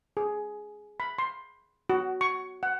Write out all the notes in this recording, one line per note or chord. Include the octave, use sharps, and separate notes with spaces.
G#4
B5
C6
F#4
C#6
F#5